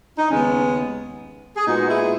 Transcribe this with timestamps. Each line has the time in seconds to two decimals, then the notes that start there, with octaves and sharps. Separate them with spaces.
0.18 D#4
0.30 D#2 C#3 G#3 B3 C#4
1.56 G#4
1.67 A#2 G#3 B3 D#4 F#4
1.90 E4 G#4